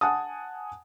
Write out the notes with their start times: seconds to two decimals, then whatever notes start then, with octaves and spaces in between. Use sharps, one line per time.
0.01 F#5 G#5 A5 D#6